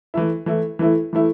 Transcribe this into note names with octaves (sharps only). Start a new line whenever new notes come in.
E3 A3 E4
E3 A3 E4
E3 A3 E4
E3 A3 E4